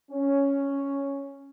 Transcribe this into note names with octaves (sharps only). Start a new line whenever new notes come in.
C#4